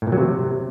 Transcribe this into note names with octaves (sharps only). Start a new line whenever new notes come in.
A2
A#2
F#3
C3